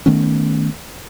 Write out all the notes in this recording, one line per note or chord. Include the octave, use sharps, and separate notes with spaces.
D#3 A3 B3 C#4